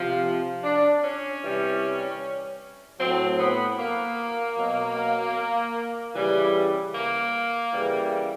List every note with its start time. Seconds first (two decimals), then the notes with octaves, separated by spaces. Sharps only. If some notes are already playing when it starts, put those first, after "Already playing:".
Already playing: C3 F3
0.63 D4
1.02 C#4
1.41 C3 E3 G3
2.99 A2 F#3 C4
3.39 B3
3.78 A#3
4.57 B2 F#3
6.15 C#3 E3 G3
6.94 A#3
7.73 C#3 E3 G3